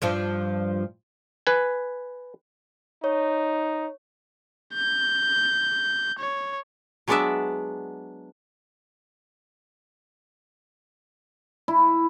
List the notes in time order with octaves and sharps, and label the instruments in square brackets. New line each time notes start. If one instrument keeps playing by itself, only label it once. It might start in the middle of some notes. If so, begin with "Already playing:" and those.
[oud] G2 F3 D4
[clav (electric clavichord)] B4 G#5
[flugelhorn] D#4 [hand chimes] C#5
[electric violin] G6
C#5
[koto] F#3 G#3 B3 D4 D5 E5
[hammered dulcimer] E4